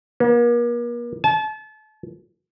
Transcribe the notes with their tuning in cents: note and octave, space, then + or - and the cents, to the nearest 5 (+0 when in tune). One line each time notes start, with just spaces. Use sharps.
A#3 +40
A5 -30